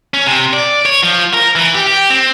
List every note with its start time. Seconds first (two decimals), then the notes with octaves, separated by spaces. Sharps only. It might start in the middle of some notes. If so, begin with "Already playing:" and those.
0.14 C#4
0.27 C3
0.53 D5
0.86 C#5
1.03 F3
1.33 A#4
1.56 E3
1.74 G4
1.87 G4
2.10 C4